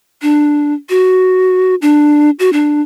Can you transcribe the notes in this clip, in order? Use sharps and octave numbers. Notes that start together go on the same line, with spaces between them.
D4
F#4
D4
F#4
D4